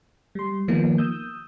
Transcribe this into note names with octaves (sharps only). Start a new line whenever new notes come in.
G3 C6
D#3 F3 A#3 B3
D#6 E6 G6